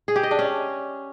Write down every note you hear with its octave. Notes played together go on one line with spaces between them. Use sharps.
G#4
G4
D#5
D4
C#4